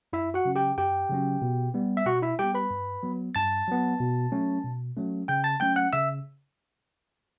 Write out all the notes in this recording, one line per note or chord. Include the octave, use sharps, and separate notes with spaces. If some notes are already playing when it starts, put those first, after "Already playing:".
F#2 E4 E5
F#4 F#5
C#3 F#3 C#4
G4 G5
F#2 G4 G5
C#3 F#3 C#4
B2
G3 B3
E5
B2 F#4 F#5
E4 E5
G3 B3 G4 G5
B4 B5
G2
F#3 B3
G2 A5 A6
F#3 B3
B2
F#3 A3 C#4
B2
F#3 A3 C#4
C#3 G5 G6
A5 A6
F#3 A3 C#4 G5 G6
F#5 F#6
C#3 E5 E6